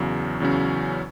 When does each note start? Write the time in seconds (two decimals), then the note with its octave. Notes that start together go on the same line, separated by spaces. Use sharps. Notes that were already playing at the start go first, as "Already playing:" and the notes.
Already playing: E2 C#3 F#3
0.40 E2 C#3 F#3 C#4